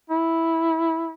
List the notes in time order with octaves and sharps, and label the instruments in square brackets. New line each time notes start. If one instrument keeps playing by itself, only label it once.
[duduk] E4